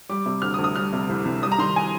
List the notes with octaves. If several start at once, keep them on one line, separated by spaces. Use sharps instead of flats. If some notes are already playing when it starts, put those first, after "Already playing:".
G3 D6
C3
D2 F6
D#6
D2
D#6
G3 F6
C3
C2
C2
G3 D#6
A#5
D#3 C6
G#5